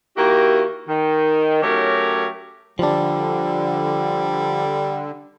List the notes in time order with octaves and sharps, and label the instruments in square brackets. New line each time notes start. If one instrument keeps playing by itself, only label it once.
[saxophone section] D#3 A#3 E4 F#4 G4
D#3
F#3 A3 C#4 G4 A#4 C#5
[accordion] D3 [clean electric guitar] F3 D4 [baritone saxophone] G3